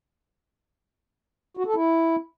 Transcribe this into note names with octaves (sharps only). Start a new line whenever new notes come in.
F#4
A4
E4